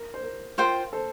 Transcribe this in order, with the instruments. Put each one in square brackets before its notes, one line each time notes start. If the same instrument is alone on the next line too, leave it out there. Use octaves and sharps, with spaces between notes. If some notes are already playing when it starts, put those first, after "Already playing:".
Already playing: [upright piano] A#4
C5
A#4
[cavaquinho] F4 C5 G5 C6 [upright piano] A#4
[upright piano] A4 C5